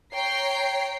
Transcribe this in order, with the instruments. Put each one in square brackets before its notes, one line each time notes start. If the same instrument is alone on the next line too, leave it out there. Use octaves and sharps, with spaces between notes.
[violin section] C#5 G5 A#5 C7